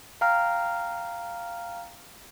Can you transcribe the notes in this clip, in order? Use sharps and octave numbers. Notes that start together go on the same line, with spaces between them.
F5 G5 A#5 F6